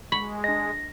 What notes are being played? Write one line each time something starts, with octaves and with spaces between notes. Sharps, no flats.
G#3 B5 C#6
D4 D#5 A#6